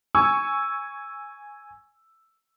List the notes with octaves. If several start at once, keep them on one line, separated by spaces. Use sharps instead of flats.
G#5 C#6 E6